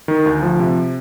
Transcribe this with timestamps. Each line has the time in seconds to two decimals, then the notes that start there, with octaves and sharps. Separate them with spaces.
0.08 D#3
0.26 D2
0.43 F3
0.60 C3